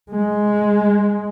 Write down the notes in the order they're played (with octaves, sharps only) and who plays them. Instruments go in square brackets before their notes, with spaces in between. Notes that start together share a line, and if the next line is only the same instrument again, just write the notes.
[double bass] G#3